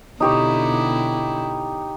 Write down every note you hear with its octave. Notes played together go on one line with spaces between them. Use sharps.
B2 D3 D#4 E4 G4 C#5